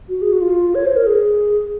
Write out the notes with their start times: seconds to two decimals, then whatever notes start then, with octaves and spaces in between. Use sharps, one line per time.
0.09 F#4
0.22 G#4
0.32 F#4
0.41 F4
0.75 C#5
0.86 C5
0.96 A#4
1.06 G#4